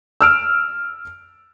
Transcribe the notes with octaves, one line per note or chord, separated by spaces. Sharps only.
E6 F6 D7